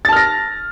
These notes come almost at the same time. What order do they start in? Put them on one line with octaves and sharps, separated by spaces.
A6 A5 F6 A#6